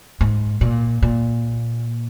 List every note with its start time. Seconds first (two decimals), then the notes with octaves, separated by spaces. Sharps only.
0.21 G#2
0.61 A#2
1.03 A#2